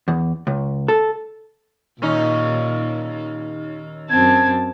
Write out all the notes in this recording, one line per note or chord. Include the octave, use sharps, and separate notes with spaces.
E2
C#2
A4
D#2 A#2 C#4 D#4
F#2 C4 A5 G#6